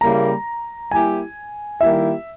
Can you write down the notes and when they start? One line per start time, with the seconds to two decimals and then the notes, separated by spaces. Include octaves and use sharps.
0.01 C#3 G3 A#3 E4 A#5
0.91 G3 A#3 E4 G4 G#5
1.81 D#3 G3 A#3 E4 G4 E5